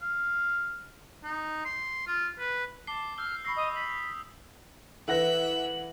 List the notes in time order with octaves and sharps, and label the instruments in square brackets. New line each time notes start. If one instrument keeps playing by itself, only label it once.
[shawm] F5
D#4
C6
F4
B4
[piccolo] A5 [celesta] D6 G7 [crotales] C7
[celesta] E6 [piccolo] F6 [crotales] G6 G7
[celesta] B5 C#6 A#6 [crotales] E6 [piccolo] C7
[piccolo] D#5 [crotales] D#6
[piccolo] B6 [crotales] F#7
[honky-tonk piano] E3 F#5 A#6 [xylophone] A4 B4 [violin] E5 E6 [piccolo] F#7